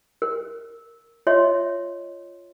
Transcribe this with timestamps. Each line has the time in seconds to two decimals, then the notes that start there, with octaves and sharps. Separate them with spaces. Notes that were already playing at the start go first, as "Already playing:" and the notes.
0.22 A#4
1.27 F4 C#5 D#5 E5 C6